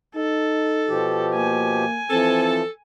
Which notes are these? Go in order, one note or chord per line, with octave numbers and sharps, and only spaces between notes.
D#4 A4
B2 F3 G4
A#3 G#5
E3 F3 C4 A4